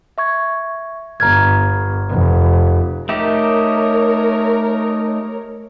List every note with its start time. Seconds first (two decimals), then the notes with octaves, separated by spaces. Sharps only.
0.18 E5 C#6 G#6
1.20 G1 A#5 F6 G#6
2.10 F1
3.09 A3 D#4 G4 A#4 C#5